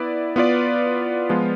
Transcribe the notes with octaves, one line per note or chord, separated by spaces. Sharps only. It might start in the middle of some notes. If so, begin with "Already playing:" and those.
Already playing: B3 E4 B4 D5
B3 F4 B4 D5
F3 G#3 B3 F4